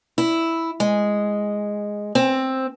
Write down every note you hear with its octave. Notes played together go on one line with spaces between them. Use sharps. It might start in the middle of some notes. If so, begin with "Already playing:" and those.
E4
G#3
C4